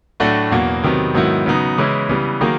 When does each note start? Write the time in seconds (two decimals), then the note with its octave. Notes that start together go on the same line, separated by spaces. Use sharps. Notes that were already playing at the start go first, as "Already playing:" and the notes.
0.20 A2 F#3 A3 D4 F#4
0.51 E2 B2 F#3 A#3
0.83 C3 D#3 F#3 B3
1.14 G#2 D#3 F#3 B3 E4
1.46 C#3 F#3 B3 D#4
1.78 C#3 E3 G#3 C#4 E4
2.09 C#3 E3 G3 B3
2.41 D#3 F#3 A#3 D#4 G#4